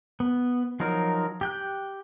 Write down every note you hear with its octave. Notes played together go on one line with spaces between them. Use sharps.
B3
F3 F#3 D#4 A#4
G4 G5 F#6